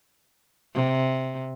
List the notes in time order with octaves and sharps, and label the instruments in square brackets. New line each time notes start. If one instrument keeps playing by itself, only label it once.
[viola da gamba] C3